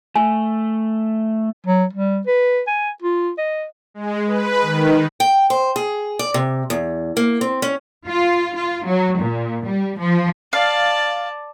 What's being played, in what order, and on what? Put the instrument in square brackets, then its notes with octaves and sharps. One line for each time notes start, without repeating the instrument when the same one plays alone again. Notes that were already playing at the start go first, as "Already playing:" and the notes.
[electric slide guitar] A3 [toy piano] G#5
[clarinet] F#3
G3
B4
G#5
F4
D#5
[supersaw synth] G#3
B4
D#3
[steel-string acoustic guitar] G5
C5
G#4
D5
C3
E2
A#3
C4
C#4
[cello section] F4
F4
F#3
A#2
G3
F3
[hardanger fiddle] D5 A5 [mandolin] F5